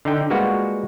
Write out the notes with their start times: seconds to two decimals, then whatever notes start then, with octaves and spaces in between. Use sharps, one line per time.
0.05 D3 D#4 G5
0.30 G3 G#3 A#3 B3 F4 F#4